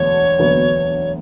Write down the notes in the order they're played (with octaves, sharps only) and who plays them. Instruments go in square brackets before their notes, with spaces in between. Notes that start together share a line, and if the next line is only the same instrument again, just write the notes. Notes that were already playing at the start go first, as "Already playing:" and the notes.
Already playing: [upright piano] E1 D2 D3 F#3 B3 [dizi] C#5
[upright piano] E1 D2 D3 F#3 B3